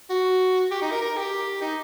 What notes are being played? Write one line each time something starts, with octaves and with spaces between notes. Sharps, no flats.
F#4
G4
D#4
A#4
A#4
G4
D#4